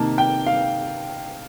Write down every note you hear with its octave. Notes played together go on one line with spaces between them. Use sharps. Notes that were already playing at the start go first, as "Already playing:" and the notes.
Already playing: C3 D#3 A#3 A5
G5
F5